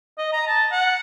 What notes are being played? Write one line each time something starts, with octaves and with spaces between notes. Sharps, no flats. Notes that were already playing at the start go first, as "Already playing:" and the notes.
D#5
A#5
A5
F#5